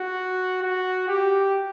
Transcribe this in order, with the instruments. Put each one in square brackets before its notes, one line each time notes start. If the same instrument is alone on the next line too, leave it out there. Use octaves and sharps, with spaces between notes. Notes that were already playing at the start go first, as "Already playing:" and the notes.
Already playing: [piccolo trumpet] F#4
F#4
G4